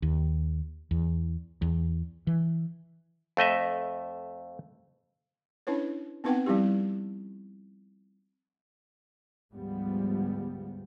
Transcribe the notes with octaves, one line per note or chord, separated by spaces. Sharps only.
D#2
E2
E2
E3
F2 A3 D#5 E5
C#4 D4 E4 B4 C#5
B3 C4 D#4 B4 F#5 G5
F3 G3 C4 E4 G4
D2 G#2 F3 G3 G#3 B3